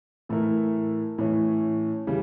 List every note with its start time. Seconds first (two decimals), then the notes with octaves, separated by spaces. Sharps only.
0.29 A2 E3 A3 E4 A#4
1.18 A2 E3 A3 C#4
2.07 C#3 E3 G3